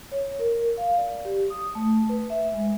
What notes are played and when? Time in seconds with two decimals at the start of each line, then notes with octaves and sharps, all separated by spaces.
0.11 C#5
0.39 A#4
0.78 F5
0.98 D5
1.25 G4
1.50 D#6
1.75 A3
2.09 B4
2.30 E5
2.54 G#3